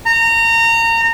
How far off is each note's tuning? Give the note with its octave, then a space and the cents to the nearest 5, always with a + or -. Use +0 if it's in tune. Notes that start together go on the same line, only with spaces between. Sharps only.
A#5 -25